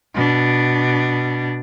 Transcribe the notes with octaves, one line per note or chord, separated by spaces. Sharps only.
B2 D4